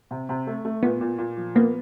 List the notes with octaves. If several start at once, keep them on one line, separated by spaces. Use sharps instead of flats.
C3
C3
A3
A3
A#2 B3
A#2
A#2
F3
A#3 B3